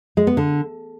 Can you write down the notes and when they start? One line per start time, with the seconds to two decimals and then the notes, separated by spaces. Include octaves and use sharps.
0.17 G#3
0.27 B3
0.37 D3